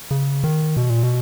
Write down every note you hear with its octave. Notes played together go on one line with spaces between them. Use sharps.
C#3
D#3
B2
A#2
B2